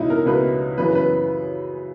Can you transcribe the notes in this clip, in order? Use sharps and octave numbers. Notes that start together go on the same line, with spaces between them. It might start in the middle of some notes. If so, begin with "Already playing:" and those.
Already playing: C#2 B2 C#4 D#4 E4
A#4
C#2 B2 B4
F#2 C#3 E3 B4
B4